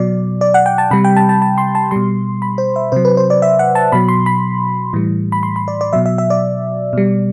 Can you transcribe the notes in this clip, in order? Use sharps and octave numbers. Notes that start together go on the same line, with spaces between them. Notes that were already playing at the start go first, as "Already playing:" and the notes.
Already playing: B2 F#3 D5
D5
F#5
G5
A5
C3 G3 B5
G5
A5
A5
A5
C6
A5
B2 G3 C6
B5
C5
E5
C3 F#3 C5
B4
C5
D5
E5
F#5
A5
B2 F#3 B5
C6
B5
A2 E3 G3
B5
C6
B5
D5
D5
B2 F#3 E5
E5
E5
D5
B2 G3